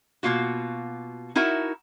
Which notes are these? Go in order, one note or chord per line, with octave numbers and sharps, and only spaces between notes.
B2 A#3 F4 F#4
D#4 E4 F#4 A#4 E5